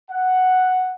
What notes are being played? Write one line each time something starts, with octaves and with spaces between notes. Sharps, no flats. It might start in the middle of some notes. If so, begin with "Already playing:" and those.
F#5